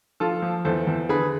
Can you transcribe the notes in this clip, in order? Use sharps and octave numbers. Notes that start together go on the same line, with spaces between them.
F3 F4 A4
F3
E2 A4 C5
E2
D3 G#4 B4